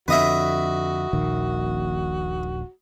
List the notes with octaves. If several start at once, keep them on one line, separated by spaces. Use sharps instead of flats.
F2 D3 F#4 B4 D#5 E5
D#1 A#1 D#3